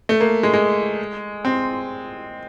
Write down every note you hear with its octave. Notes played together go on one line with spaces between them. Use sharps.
A3
A#3
G#3
G#3
C4